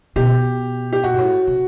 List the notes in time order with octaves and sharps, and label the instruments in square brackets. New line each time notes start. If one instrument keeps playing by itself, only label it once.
[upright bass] B2 [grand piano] G4
[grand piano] G4
[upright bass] A#2 [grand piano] F#4
[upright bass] G#2
A2
C3